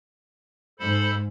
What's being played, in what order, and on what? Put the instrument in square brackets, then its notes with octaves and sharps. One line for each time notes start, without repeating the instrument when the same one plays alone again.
[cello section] G#2 [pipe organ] A4 C5 B5